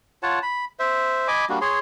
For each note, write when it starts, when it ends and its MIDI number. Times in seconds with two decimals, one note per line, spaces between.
0.23 0.39 65
0.23 0.39 73
0.23 0.39 78
0.23 0.39 81
0.43 0.65 83
0.79 1.28 72
0.79 1.28 76
1.28 1.45 75
1.28 1.45 80
1.28 1.45 83
1.28 1.45 86
1.49 1.59 55
1.49 1.59 58
1.49 1.59 62
1.49 1.59 66
1.61 1.79 68
1.61 1.79 73
1.61 1.79 84